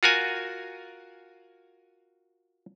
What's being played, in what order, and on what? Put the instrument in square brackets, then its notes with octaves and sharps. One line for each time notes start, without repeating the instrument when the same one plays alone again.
[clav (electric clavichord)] F4 F#4 A#4 G#5